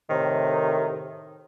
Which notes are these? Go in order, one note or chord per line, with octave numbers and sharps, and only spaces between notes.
A2 C3 D#3